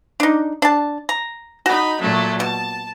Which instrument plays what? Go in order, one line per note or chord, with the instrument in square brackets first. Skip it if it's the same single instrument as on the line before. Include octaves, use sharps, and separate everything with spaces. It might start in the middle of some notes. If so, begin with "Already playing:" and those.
[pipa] D4 D#4
D4 A5
A#5
[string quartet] D#4 B5 [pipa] F#4
[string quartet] A#2 F#3 A3
[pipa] B2 [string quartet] A5